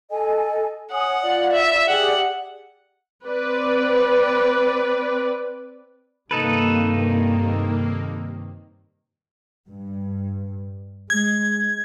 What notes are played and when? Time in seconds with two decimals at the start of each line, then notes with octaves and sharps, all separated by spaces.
0.11 A4 D#5 G#5
0.92 C#5 F#5 G#5 D#6
1.22 F4 D5
1.53 E5
1.88 G4 G#4 D5 F#5
3.25 C4 B4 D5
6.31 G2 C3 D#3 A#3 D#4 A4 B4
9.68 G2
11.10 G#3 G#6